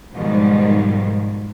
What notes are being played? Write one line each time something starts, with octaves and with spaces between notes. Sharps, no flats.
G#2 B2 D#3 F3 G3